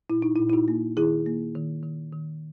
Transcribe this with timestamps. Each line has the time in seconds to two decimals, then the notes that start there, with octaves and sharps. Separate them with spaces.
0.10 A#2 E4
0.22 D#4
0.36 A#2 E4
0.49 E4
0.53 D#4 F#4
0.68 A#3
0.97 D#3 E4 G#4
1.26 A#3
1.55 D#3
1.83 D#3
2.12 D#3